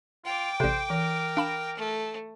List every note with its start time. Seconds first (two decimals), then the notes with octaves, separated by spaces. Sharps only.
0.25 F4 G5 D6
0.60 A1 C3 A4 C5 D5
0.90 E3 A#4
1.37 D4 F5 B5 E7
1.77 A3